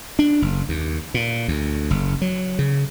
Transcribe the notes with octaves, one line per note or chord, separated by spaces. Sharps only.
D4
F#1
D#2
A#2
D2
F#1
F#3
C#3